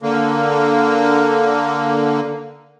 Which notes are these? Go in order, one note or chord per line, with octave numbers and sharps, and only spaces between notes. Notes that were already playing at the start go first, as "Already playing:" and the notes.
D3 A#3